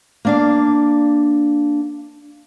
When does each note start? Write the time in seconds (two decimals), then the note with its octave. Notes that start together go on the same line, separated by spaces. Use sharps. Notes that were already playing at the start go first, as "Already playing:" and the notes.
0.25 A#3 D4 F5